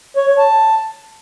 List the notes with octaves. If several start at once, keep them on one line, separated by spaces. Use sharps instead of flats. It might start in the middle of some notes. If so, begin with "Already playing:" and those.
C#5
C#5
A5